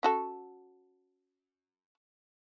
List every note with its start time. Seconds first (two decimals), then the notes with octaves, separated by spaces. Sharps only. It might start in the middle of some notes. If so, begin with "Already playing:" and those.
0.03 C#4 F#4 A4